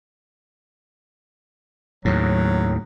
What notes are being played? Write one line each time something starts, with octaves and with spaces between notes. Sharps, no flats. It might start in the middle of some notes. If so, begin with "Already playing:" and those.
D#2 A2 F#3